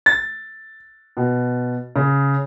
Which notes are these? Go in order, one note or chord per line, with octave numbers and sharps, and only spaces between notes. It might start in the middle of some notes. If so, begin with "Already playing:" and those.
A6
B2
C#3